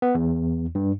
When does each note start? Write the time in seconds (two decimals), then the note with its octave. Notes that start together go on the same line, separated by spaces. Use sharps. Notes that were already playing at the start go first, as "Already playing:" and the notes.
0.02 B3
0.15 E2
0.75 G2